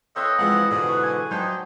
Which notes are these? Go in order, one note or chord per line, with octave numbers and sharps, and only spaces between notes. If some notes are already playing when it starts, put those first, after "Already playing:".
C4 F4 A4 B4 C#5 D#5 E5
E3 F3 G#3 C4 F4 G#4 F#5 B5
G#2 B2 D3 E3 D#6
F#5 C#6
G#5
F3 F#3 D4 D#4 C5 G5 A5